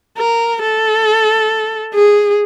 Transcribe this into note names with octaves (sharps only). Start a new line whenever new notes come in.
A#4
A4
G#4